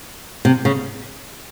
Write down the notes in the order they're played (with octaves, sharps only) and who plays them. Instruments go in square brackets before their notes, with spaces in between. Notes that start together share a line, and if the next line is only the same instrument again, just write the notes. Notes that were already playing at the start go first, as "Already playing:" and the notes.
[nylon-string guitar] C3
C#3